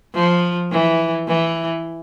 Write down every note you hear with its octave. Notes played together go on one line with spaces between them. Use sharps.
F3
E3
E3